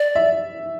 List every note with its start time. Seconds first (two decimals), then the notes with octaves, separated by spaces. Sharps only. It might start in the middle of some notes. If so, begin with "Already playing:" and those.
Already playing: D5
0.15 E5